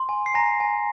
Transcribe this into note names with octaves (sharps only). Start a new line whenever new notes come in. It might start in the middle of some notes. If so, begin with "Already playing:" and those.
Already playing: C6
G#5
C7
G#5 A#5 A#6
G#5